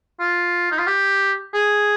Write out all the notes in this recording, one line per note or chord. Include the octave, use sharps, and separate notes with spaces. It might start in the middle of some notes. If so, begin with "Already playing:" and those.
F4
D#4
F4
G4
G#4